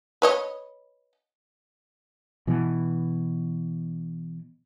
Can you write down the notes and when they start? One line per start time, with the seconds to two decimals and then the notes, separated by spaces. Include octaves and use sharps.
0.22 B4 C#5 D#5
2.47 B2 E3